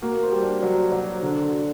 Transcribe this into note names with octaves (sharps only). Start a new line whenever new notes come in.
A#3 F#4
C5
G3
D4
F#3 D4
F#4
F#3
C5
D3 D4
F#4